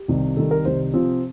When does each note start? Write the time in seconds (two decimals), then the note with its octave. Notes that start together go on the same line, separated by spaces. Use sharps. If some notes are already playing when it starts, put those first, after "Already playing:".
Already playing: G4
0.08 C2 C3 D#3
0.37 C2 C3 D#3 A4
0.51 A#4
0.65 C2 C3 D#3 C5
0.94 C3 F3 C4